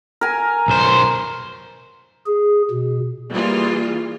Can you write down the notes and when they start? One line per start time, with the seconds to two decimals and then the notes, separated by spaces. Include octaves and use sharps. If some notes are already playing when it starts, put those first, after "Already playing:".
0.21 A#4 G#5 A#5
0.68 B1 C5
2.26 G#4
2.71 B2
3.30 E3 G3 A#3 F4 G#4